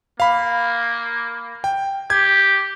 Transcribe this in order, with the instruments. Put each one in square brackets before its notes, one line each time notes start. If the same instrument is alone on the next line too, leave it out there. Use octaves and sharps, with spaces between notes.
[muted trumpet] A#3 [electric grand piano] F5 B5
[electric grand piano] G5
[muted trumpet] G4 [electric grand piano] G#6